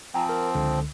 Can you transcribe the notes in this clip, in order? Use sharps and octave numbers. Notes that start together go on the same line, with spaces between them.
F3 C4 G5 G#5 A#5
A#4
C#2 D3